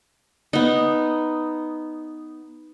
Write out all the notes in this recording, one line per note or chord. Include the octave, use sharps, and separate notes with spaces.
B3 D#4